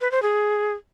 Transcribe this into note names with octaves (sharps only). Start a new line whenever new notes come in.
B4
C5
G#4